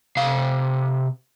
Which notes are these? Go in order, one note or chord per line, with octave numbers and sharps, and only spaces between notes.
C3 F5